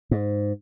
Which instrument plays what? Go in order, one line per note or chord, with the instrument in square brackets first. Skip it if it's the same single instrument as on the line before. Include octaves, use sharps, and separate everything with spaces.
[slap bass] G#2